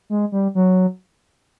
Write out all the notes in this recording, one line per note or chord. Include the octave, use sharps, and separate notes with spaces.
G#3
G3
F#3